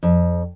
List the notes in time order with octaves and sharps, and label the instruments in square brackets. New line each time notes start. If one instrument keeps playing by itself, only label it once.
[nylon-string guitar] F2